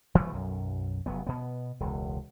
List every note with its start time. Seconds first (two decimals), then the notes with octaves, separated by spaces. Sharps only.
0.15 E3 F#3 G#3 A3
0.33 B1 F#2
1.06 F1 F#3 B3
1.27 B2 B3
1.80 E1 C#2